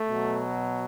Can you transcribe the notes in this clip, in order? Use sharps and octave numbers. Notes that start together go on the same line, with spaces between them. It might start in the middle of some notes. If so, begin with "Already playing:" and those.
Already playing: A3
B2 F#3